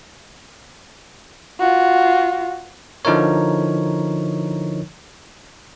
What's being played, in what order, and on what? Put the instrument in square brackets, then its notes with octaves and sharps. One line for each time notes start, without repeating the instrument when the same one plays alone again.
[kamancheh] F4 F#4
[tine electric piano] D3 F3 D#4 E4 A#4 C#5